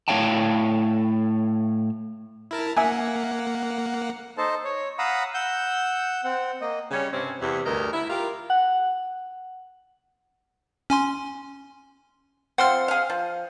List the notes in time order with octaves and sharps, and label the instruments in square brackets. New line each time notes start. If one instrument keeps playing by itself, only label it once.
[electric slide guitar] A2 F4 C#5 F5 G5 A5
[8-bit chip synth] E4 A#4 A5
[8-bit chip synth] A#3 F#5 [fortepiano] E5 G#5
[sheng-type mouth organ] D#4 A4 C5 A5
C#5
F5 F#5 A#5 B5 D#6 E6
F#5 E6 G6
C4 F#5
A#3 D#5
[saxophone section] C#3 G3 C#4
G2 C3 C4 C#4
E2 C3
D2 G2 A#4 D#5
E4
F4 G4 A#4
[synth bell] F#5
[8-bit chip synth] C#4 G#5 C6
[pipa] F3 C4 [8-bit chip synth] F#5 C6 F6
[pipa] G#4 F5
F3